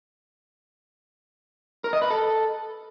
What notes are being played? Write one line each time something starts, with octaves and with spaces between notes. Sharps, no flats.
A#4
D#5
B4
A4